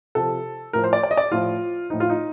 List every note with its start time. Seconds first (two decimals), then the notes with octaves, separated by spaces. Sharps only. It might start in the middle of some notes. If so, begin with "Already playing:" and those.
0.15 C3 F3 A4
0.73 A2 F3 A#4
0.84 C5
0.93 D5
1.03 D5
1.11 D#5
1.17 D5
1.32 A2 F3 F4
1.90 A2 F3 D#4
2.00 F4
2.10 D#4